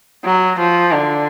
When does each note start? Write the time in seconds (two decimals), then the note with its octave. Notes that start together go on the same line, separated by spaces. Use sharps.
0.24 F#3
0.59 F3
0.92 D3